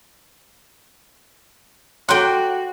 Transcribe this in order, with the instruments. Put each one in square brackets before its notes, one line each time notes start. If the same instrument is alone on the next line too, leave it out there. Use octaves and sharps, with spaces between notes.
[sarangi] F#4 [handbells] A4 C#5 A#5 [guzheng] F#5 G5 [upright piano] C6